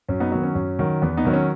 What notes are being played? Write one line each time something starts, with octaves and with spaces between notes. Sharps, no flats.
F#2 C#4
B3 D#4
D#3 F#3 B3
C#4
F#2
D#3 F#3
E2 B3
B3 D#4
D#3 F#3
C#4